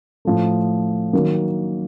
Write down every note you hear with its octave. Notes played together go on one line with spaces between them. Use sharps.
A2 F3 A3
D#3 F#3 A#3